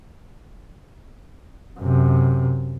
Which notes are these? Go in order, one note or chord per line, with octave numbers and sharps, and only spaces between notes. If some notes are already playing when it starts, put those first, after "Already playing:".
F#2 C3